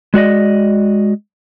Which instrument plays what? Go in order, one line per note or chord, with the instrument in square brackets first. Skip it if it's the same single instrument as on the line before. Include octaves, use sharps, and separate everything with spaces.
[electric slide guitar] G#3 F#4 D5 D#5